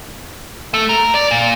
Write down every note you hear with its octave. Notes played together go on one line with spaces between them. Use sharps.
A3
A#4
D5
A#2